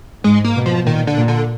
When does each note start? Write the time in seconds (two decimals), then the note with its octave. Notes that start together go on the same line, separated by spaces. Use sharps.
0.24 G#2 G#3
0.44 A#3
0.56 B2
0.66 F3
0.86 A#2 D#3
1.07 D3
1.18 A#2
1.28 D3